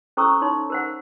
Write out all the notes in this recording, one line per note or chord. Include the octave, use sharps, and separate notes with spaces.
C#4 A4 C5 A#5 C#6 E6
D#4 C#5 C6
A#4 C5 F#5